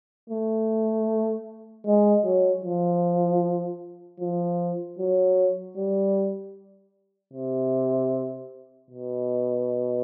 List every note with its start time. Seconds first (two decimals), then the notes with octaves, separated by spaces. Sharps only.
0.30 A3
1.87 G#3
2.25 F#3
2.64 F3
4.20 F3
4.98 F#3
5.77 G3
7.33 C3
8.90 B2